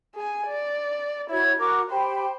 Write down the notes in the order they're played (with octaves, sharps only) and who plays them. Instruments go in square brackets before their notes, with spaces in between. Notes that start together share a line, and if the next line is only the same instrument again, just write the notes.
[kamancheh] G#4 G#5
D5
[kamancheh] E4 [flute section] F#4 C#5 G#6
[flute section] F#4 D6 [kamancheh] A#4
[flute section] G4 G5 B5 [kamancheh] C5